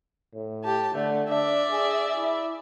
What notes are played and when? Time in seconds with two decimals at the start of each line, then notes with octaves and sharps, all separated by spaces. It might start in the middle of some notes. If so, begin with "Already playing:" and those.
0.35 A2
0.64 G4 A5
0.95 D3 A3
1.29 D4 D5 E5
1.71 G#4
2.16 E4